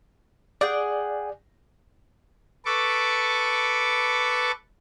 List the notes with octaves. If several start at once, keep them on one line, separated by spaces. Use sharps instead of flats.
G#4 D5 F#5 G5
A4 B4 C#6 D6